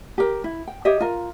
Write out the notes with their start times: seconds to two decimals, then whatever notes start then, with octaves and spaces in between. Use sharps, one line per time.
0.18 G4 A#4
0.44 E4
0.67 G5
0.85 G4 C#5 D#5 E5
1.00 F4 A#4